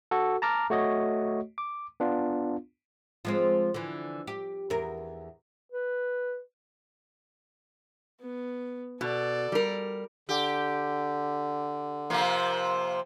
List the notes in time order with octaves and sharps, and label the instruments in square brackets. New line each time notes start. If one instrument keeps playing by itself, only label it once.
[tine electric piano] F#4 A4
A5 A#5 D6 F6
A3 F#4 C#5 D#5
D6
B3 D4 F4
[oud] F3 G#3 C4
D3 E3
G4
E2 A#4
[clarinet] B4
[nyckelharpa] B3
[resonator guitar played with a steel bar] B2 [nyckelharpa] A4 D5
[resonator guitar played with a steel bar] G3 A#4
[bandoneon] D3 [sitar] G4
[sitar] C3 F3 A#3